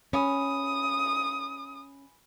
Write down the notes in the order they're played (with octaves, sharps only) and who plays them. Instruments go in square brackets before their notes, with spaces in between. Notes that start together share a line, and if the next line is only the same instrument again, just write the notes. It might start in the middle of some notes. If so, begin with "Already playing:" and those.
[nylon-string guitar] C#4 [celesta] G#5 B5 [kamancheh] D#6